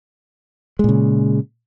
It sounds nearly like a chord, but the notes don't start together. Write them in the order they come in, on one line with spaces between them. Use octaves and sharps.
G#3 A#2 C#3